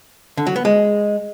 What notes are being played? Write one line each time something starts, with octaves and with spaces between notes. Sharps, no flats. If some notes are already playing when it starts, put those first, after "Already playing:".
D3
F#3
B3
G#3